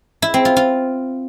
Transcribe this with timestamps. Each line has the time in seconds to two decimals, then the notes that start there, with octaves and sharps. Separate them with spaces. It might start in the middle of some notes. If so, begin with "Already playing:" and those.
0.22 E4
0.34 C4
0.45 F4
0.57 F4